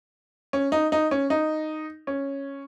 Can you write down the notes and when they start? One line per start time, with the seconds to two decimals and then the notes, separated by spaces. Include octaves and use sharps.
0.53 C#4
0.72 D#4
0.92 D#4
1.11 C#4
1.30 D#4
2.07 C#4